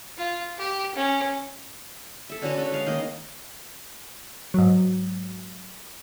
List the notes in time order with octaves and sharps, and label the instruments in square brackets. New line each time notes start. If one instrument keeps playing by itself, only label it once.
[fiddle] F4
G4
C#4
[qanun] A4 E5
D3 C#4 F#4 B4
C#4 A4
G#3 F5
D#3 A#3 D#5
[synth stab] G#2 F#3